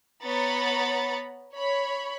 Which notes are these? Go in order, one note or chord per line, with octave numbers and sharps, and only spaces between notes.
B3 C#5 A#5 B5 A6 C#7
C#5 B5